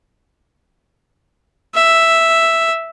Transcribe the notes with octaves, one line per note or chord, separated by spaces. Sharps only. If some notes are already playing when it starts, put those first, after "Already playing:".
E5